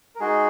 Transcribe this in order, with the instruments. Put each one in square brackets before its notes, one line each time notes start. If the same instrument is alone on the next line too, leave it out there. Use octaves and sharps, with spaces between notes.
[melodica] A#4
G#3 D#4 F#4 G#4